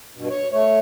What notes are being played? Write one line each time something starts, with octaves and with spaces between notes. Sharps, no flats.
G2 B2
C#5
A3 C#5